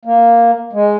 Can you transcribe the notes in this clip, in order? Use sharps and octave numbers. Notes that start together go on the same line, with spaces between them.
A#3
G#3